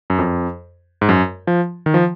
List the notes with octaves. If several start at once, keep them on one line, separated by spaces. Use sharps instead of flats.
F#2
F2
G#2
F#2
F3
D#3
F3